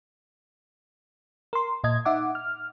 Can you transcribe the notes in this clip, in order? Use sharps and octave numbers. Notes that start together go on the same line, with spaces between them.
A#4 C6
A#2 D#5 G#6
D#4 E5 F#5 D6
F6